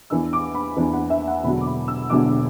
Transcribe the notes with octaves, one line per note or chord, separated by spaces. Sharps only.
E2 E3 D4 E6
D6
B5
E2 E3 D4
F#5
E5
F#5
E1 E2 D3 F#3 D4 B5
D6
B5
E6
E1 E2 D3 F#3 D4 D6